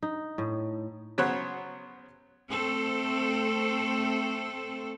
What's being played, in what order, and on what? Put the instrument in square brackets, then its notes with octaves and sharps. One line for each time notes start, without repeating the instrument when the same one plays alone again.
[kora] D#4
A2
[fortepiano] C#3 F#3 B3 C5 C#5 F#6
[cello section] A3 C4 A4